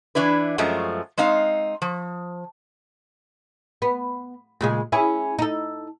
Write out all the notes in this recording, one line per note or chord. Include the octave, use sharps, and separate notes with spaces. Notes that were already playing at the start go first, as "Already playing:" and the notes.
E3 D4 E4 B4
F#2 F3 G#3 A3
G#3 C4 D#4 F5
F3
B3
A#2 C#3 G#3
C#4 E4 G#4
D#4 A4